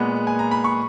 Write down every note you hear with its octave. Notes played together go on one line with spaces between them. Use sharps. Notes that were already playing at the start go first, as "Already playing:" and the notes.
Already playing: A#2 G#3 B3 F#5
G#5
A#5
B5
C#6